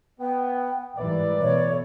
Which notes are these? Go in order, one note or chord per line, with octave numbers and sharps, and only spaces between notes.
B3 G5
G#2 E3 G3 A#4 B4 D5 E5
B2 E3 A3 C#5